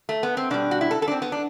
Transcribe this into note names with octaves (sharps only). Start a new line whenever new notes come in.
A3
B3
C4
B2 G3 D4
F#4
E4
A4
A4
D4
C4
B3
D4